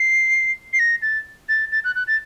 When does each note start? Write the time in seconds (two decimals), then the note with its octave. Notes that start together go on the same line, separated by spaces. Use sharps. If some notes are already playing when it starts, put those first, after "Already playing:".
Already playing: C7
0.73 C7
0.79 A#6
1.02 A6
1.49 A6
1.72 A6
1.84 F#6
1.95 F#6
2.07 A6